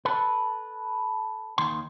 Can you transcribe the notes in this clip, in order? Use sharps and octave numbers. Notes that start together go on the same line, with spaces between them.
A4 B4
D#2 D#3 C6